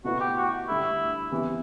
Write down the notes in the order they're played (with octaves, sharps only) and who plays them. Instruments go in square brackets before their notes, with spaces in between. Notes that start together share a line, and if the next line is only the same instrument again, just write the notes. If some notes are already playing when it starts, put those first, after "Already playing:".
[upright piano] B2 A3 E4 B4 [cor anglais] F#4
[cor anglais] G4
F#4
[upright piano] G2 D3 A3 [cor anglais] E4
[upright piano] C3 E3 B3